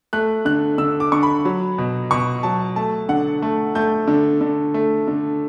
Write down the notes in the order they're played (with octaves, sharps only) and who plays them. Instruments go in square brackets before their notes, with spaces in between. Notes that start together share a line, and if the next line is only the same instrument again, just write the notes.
[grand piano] A3 F#6
D3 F#6
D3 E6
D6
D3 C#6
B5
F#3
B2
B2 C#6
F#3 A5
A3 A5
D3 F#5
A3
A3 G6
D3
D3
A3
D3